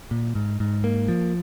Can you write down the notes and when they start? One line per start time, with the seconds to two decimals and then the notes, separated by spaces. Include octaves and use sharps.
0.11 A#2
0.35 G#2
0.60 G#2
0.84 A#3
1.08 F3